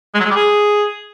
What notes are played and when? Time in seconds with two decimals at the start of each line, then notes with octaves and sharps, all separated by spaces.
0.15 G#3
0.20 F#3
0.25 G#3
0.31 G3
0.36 G#4